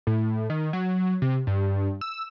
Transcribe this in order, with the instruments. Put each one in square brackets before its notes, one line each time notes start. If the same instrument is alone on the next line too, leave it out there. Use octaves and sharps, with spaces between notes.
[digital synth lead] A2
D#3
F#3
C3
G2
E6